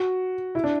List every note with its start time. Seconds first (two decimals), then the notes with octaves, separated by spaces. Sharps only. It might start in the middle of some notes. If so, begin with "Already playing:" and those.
Already playing: F#4
0.55 E4
0.64 D4